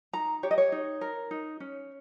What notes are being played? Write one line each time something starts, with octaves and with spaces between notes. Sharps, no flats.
D#4 A#5
G4 C#5
D#5
C#5
D#4
A#4
D#4
C#4